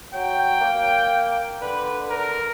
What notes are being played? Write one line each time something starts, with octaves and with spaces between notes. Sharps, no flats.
F#3 G5
A#3
D3 B4
A#4